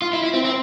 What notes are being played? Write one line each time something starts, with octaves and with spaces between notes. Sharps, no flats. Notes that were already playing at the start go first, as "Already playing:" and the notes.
F4
E4
E4
C4
C4